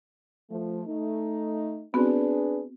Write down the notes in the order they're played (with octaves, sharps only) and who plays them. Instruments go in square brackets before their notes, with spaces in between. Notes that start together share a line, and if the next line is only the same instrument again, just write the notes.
[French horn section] F3 A3
A3 D#4
[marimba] B3 C4 F#4 [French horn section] D4 G#4 B4